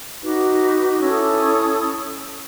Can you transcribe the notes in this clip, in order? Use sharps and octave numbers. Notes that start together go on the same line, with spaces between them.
D#4 F#4 B4 D6
C#4 E4 A4 E6
D#6
D6
D#6